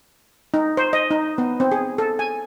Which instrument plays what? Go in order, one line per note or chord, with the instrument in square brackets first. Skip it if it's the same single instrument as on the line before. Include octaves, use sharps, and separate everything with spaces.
[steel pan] D#4
C5
D#5
D#4
B3
C4
G#4
A4
G#5